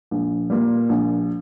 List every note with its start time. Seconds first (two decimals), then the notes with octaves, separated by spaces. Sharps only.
0.11 A#1
0.50 A#2 G3
0.89 A#1